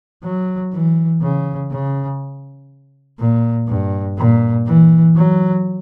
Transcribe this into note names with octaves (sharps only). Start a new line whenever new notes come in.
F#3
E3
C#3
C#3
A#2
G2
A#2
E3
F#3